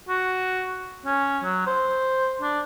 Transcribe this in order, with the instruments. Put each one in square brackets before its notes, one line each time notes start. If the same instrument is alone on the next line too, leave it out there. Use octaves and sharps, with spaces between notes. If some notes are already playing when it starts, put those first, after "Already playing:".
[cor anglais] F#4
C#4
F#3
C5
D4